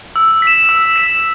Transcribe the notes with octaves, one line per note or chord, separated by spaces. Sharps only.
E6
B6 E7
E6
B6 E7